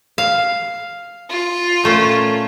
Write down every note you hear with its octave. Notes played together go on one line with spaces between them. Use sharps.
F5
F4
A#2 A3 C#4